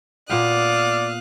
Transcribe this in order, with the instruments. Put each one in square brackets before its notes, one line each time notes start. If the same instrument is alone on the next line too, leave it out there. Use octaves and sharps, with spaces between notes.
[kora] A#2 B3 G5 [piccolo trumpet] D5 [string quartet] F5 D#6 F#6